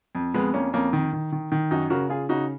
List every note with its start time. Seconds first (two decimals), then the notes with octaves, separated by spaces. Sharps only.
0.15 F2
0.34 F2 G#3 B3
0.54 F2 A#3 C#4
0.73 F2 A#3 C#4
0.93 D#3
1.13 D#3
1.32 D#3
1.52 D#3
1.71 F#2 D#4 F#4
1.90 C#3 F#4 A#4
2.09 C#3 F4 G#4
2.29 C#3 D#4 F#4